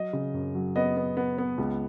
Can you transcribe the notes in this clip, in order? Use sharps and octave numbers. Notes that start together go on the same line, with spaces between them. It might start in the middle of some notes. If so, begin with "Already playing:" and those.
Already playing: F#3 D#5
C#3
F#2
F#3
B3 D#5
B3
B3
B3
C#2